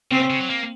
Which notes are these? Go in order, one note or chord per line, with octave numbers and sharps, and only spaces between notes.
C#3 C4
C#3
F#3
A#3